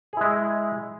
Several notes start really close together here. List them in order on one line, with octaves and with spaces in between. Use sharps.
G#4 E4 G#3